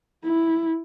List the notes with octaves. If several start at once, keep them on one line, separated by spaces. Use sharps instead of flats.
E4